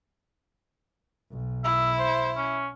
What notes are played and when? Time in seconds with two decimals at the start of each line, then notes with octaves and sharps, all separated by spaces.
1.32 B1
1.65 E4 E5
1.99 C5
2.37 C#4